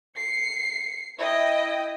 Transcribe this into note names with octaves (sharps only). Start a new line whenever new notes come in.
C7 C#7
E4 D#5 G5